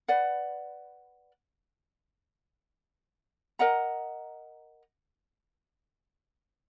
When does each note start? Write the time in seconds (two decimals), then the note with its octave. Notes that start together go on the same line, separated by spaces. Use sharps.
0.08 B4 D5 F#5
3.59 A#4 D#5 F#5 A#5